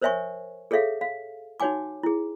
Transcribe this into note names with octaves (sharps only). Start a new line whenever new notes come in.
A#4 C5 C#5 E5 G#5 C#6
G#4 A4 C#5 E5 F5
F5
D#4 F#4 C#5 F#5 G#5 D6
E4 G#4